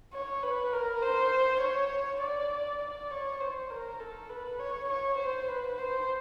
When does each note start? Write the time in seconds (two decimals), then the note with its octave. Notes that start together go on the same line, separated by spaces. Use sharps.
0.13 C#5
0.43 B4
0.73 A#4
1.02 C5
1.61 C#5
2.21 D5
2.81 D5
3.10 C#5
3.40 C5
3.70 A#4
3.99 A4
4.29 B4
4.59 C#5
4.89 C#5
5.18 C5
5.48 B4
5.77 C5